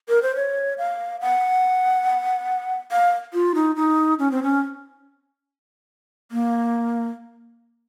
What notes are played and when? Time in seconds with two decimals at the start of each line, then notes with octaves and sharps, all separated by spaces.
0.09 A#4
0.22 C5
0.36 C#5
0.78 F5
1.21 F#5
2.92 F5
3.33 F4
3.55 D#4
3.76 D#4
4.19 C#4
4.31 C4
4.43 C#4
6.32 A#3